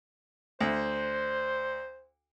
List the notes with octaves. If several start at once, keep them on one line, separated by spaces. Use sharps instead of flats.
D2 C5